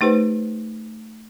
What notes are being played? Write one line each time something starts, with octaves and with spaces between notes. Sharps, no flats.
A3 D#4 G4 B4 C5